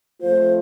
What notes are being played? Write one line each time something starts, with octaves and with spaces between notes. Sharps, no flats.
F2 F3 A3 F4 C5